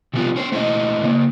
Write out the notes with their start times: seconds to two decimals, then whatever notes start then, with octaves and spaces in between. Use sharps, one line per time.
0.13 C3 F3 G3 B3 F4
0.36 C#4 C5
0.52 A3 E4 C5 D5 D#5
1.03 C#3 A#3